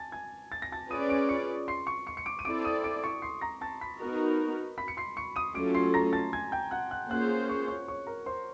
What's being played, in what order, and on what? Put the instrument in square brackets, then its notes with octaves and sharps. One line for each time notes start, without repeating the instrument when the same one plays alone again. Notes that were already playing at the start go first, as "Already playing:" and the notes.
Already playing: [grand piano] G#5 A5 A6
G#5 G#6
A6
A#6
A5 A6
[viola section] C#4 F4 G#4 B4 D5 [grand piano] D#6 D#7
[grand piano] D6 D7
C#6 C#7
C6 C7
C#6 C#7
C#6 C#7
C#7
D6 D7
D#7
[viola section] C4 E4 A4 D5 [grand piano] D6 D7
[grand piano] D#6 D#7
D6 D7
C#6 C#7
C6 C7
A#5 A#6
A5 A6
B5 B6
[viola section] B3 D#4 F#4 A#4
[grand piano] B5 B6
C#7
C6 C7
C#6 C#7
D#6 D#7
[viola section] F#3 A3 C#4 F4 A4 [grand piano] D6 D7
[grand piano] C6 C7
A#5 A#6
A5 A6
G#5 G#6
G5 G6
F#5 F#6
F#5 F#6
[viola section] A#3 C#4 F4 G#4 C5 [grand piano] F#5 F#6
[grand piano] C#5 C#6
C#5 C#6
C#5 C#6
A#4 A#5
C5 C6